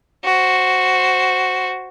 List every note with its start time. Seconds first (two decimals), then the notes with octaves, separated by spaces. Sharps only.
0.24 F#4 C5